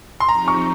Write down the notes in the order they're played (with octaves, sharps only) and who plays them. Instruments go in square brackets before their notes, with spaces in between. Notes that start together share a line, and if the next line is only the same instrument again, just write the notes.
[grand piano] C6
[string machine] F3 C4 D#4 G4 [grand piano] A#5
[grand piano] C#6